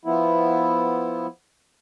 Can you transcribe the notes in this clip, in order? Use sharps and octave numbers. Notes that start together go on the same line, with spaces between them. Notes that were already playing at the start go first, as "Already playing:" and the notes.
F3 B3 E4